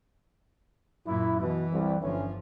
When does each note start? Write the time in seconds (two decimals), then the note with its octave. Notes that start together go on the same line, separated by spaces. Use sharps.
1.05 F#2 A#2 E4
1.41 B2 E3
1.72 C2 G3
2.01 G1 D3 E3 F3 C#4